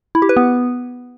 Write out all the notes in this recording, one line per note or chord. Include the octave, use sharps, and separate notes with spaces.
E4
G4
B4
B3